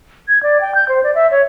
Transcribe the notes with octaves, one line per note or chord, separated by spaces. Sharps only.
G#6
D5
G5
G6
C5
D5
E5
C#5